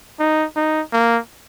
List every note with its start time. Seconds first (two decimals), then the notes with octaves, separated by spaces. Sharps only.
0.20 D#4
0.56 D#4
0.93 A#3